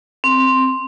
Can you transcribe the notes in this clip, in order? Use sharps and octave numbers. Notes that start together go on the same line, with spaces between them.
C4